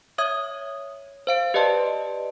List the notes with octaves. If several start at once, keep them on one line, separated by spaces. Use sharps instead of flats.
C#5 E5 D#6 G#6
C5 F5 D7
G4 B4 D5 D#5 A5 C6